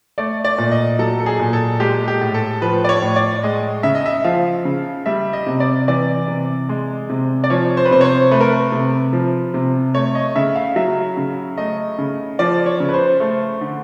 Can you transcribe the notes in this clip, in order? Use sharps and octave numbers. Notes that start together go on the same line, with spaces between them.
A3 D5
D5
A#2
D#5
F#3 A4
A4
G#4
A#2
A4
G#3 G4
G4
A2
A4
F3 B4
D5
C#5
A2
D5
G#3 D#5
C#3 E5
D#5
E5
F3 F5
C#3
G3 E5
D#5
C3
D5
E3 D5
C3
G#3
C3
D5
F3 C#5
C5
B4
C3 C5
C#5
C5
A3 B4
A#4
B4
C3
F3
C3
A3 C#5
D#5
C#3 E5
F5
F#3 E5
C#3
A3 D#5
C#3
F3 D5
C#5
C#3
B4
C5
A3
D3